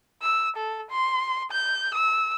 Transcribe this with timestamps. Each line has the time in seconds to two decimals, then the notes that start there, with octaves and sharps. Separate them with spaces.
0.22 E6
0.56 A4
0.91 C6
1.51 G6
1.94 E6